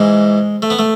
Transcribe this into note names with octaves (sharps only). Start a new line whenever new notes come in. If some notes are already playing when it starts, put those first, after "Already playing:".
Already playing: G#2 E3 G#3
A3
B3
A3